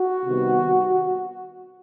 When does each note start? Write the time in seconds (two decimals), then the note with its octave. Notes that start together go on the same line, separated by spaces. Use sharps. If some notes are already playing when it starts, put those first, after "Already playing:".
Already playing: F#4
0.25 C3 D#3 G3 B3